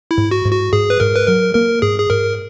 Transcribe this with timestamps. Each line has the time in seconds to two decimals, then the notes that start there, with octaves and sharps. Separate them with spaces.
0.11 E4
0.18 G#2
0.31 F#4
0.45 G#2
0.52 F#4
0.73 G#2 G#4
0.90 B4
1.00 G#2 A#4
1.15 B4
1.28 F#3 A#4
1.54 A#3 A#4
1.82 G#2 G#4
1.99 G#4
2.10 G#2 A#4